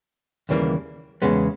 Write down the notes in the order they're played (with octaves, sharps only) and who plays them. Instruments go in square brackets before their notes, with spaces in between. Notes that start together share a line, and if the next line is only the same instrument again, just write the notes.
[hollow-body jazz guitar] D#2 C#3 E3 G3 A#3
E2 C#3 G#3 B3